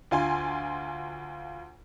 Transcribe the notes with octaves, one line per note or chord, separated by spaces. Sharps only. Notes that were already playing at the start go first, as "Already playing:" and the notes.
D2 F4 G#5 C6